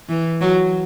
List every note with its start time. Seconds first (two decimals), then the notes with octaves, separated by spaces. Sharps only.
0.09 E3
0.41 F#3